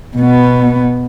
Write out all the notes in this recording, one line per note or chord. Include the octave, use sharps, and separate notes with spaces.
B2 B3